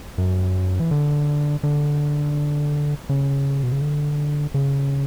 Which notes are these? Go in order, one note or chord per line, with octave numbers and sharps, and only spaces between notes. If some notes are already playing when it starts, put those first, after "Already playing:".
F#2
E3
D3
D3
C#3
B2
C#3
D3
C#3